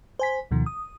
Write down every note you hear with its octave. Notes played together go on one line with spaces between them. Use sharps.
C5 G#5 B6
D2 B2 D#3 F3
D#6